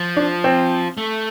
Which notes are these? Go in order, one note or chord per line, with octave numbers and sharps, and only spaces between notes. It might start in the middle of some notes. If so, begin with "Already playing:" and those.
Already playing: F3
D4
C4
A3